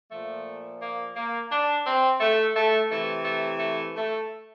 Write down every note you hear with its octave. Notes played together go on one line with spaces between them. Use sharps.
A#2 F3 A3
A#3
A#3
D4
C4
A3
A3
C3 E3 A3
A3
A3
A3